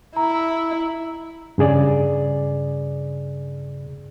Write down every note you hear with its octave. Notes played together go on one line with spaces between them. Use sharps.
E4 A#5
G2 C#3 G#4 D5